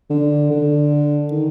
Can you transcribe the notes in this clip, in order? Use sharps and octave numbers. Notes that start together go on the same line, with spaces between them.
D3
D3
D#3